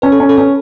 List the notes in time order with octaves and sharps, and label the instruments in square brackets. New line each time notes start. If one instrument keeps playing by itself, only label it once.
[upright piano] C#4 [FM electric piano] B4
[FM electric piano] A4
[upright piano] C#4
[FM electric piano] A4
[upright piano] C#4 [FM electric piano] B4